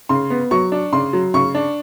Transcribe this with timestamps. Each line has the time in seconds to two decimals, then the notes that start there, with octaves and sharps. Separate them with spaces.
0.09 C#3 C6
0.30 B3
0.51 F#3 C#6
0.72 D4
0.93 C#3 C6
1.13 F#3
1.34 C#3 C#6
1.55 D4